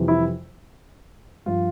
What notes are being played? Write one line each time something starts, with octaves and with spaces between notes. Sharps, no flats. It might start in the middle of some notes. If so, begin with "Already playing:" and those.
Already playing: F2 C3 E3 G3
E4
G2 F3 F4